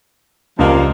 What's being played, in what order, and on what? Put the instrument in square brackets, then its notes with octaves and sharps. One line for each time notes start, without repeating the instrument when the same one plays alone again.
[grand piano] C#2 [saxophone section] F3 G3 A#3